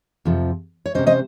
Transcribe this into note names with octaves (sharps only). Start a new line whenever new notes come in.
F2 C3 F3
C#5
C3 G3 C#4 C5 D#5
C5 D#5